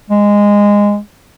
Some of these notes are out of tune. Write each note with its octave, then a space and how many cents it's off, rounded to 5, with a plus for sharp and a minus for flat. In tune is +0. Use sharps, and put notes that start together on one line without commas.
G#3 -15